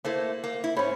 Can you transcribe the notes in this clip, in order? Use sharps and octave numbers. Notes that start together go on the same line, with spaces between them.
A3 A#3 E4 C5
A#3
E4
G#2 C#4 C5 C#5 B5